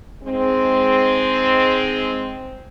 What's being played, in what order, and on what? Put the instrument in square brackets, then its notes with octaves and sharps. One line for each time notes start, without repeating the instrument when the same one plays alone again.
[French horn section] G#2 G#3 C4